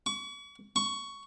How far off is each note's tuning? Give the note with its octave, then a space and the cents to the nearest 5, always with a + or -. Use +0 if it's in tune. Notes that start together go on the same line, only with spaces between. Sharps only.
C#6 +40
C#6 +10